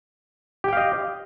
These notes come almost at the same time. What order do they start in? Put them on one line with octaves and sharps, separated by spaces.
G4 G5 F5 D#5